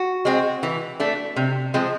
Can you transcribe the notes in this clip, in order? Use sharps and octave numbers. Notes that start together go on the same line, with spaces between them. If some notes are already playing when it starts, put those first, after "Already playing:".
Already playing: F#4
G#3 C4
E3
A3 D4
C3
F3 G#3 C4